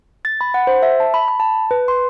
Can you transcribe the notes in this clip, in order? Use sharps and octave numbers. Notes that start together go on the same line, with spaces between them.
A6
B5
F#5
C5
E5
A5
B5
B5
A5
B4
C6